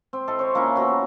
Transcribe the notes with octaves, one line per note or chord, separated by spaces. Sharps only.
C4
E4 A4 D#5 F5
C5 C#5
F3 A#3 C#4 E4
B2 F#4 A#5 B5